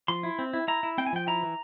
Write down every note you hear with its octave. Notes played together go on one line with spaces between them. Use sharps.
F3 C6
E4
C4
E4
E4 A#5
E4
C4 G5
G#5
F3 G5
E4 A#5
E3